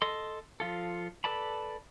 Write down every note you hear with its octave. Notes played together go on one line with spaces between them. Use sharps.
A4 D#5 C6
F3 F4 A4
A4 B4 D5 A5 B5